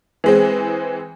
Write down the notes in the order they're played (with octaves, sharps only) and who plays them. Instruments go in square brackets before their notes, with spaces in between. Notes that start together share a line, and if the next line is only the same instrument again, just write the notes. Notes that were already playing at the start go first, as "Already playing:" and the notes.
[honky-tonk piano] E3 G#3 C4